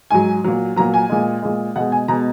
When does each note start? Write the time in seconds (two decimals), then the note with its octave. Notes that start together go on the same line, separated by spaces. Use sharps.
0.10 G#2 F#3 G#5
0.44 A#2 F#3
0.76 A#2 F#3 A#5
0.94 G#5
1.09 A#2 G#3
1.42 A#2 G#3
1.76 B2 G#3 F#5
1.92 G#5
2.08 B2 G#3 A#5